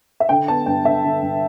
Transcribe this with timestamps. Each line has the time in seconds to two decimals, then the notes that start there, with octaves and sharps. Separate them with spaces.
0.20 E5
0.29 D3 G5
0.48 B3 A5
0.66 G2 G5
0.85 D3 E5
1.05 D3
1.22 G2